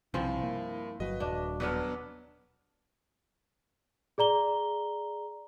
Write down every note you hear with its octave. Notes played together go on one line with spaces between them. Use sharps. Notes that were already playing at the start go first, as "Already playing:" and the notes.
B1 G2 C3 F3 C4 E4 G#5 C6
A#3
G1 F#3 F#4 B4 D#5
D#1 D4
B2 F#3 B3 D4 B4 F6
G#4 D5 A#5 G7